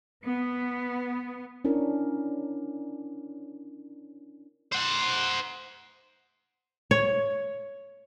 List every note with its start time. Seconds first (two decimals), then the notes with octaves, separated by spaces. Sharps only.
0.24 B3
1.65 C#4 D4 E4 A#4
4.72 C5 F#5
6.91 C#5